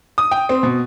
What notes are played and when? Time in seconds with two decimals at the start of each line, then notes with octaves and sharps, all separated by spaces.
0.18 D#6
0.31 G5
0.49 C4
0.63 B2